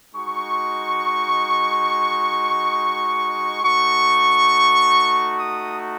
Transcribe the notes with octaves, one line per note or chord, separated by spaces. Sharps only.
G#3 D#4 F#4 C#6
A3 D#4 F#4 C#6
D#6